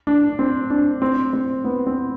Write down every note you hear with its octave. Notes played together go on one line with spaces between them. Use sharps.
D4
C4
D4
C4
C4
B3
C4